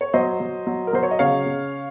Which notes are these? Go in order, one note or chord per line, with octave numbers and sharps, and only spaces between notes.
C#5
F#3 C5 D#5
F#3
F#3
A#4
F#3 C5
C#5
D#5
C#3 C#5 F5
C#3